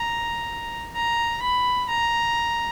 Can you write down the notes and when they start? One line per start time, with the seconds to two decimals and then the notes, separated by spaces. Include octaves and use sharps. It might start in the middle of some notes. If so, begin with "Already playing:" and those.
Already playing: A#5
0.95 A#5
1.42 B5
1.89 A#5